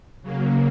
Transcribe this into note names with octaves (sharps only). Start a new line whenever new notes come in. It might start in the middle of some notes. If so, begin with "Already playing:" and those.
C#3 F#3 A#3